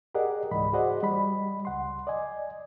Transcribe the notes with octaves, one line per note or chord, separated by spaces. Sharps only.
G4 G#4 A#4 D5 D#5 F#5
C#2 G#2 E3 D#5 B5
F#4 G#4 C5 D5 D#5 F#5
G3 D#5 B5
C#2 F#5 C6
D5 D#5 G#5